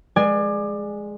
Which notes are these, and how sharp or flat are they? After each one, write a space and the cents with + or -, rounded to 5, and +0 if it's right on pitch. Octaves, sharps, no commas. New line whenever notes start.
G#3 +0 D5 +25 G#5 +0